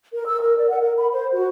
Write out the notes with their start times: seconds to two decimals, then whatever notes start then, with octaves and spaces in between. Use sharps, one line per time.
0.14 A#4
0.27 E6
0.41 A#4
0.56 D5
0.69 F#5
0.81 A#4
0.97 B5
1.12 C5
1.34 F#4